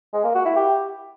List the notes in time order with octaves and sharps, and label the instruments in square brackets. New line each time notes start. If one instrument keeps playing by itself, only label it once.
[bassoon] G#3
A#3
F#4
E4
G4